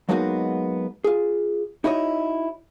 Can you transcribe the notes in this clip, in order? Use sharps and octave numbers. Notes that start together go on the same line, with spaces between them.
F#3 G#3 A#3 B3 D#4 F#4
F4 G#4
D#4 E4 F#4 C#5 D#5